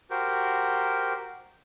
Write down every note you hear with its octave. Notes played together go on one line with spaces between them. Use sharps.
F#4 G4 A#4 C5